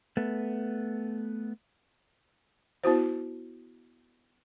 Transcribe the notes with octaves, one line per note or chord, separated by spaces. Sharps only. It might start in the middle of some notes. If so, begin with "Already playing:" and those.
A3 B3
B3 E4 F#4 C5